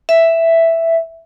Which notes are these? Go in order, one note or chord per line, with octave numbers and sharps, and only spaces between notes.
E5